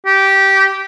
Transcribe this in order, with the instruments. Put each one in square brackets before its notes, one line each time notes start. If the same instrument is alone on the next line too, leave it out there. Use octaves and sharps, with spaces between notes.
[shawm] G4